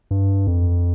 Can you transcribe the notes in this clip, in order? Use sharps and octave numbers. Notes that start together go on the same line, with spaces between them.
G2
F2